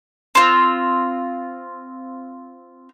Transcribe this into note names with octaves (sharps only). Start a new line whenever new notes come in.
C4 F4